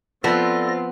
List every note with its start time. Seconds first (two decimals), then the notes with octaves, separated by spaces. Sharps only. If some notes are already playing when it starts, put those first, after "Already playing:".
0.24 F3 B3 C4 F4 A4 D5 E5 A#6